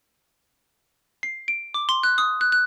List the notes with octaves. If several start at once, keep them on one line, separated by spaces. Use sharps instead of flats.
C7
D7
D6
C6
F#6
D#6
F#6
F#6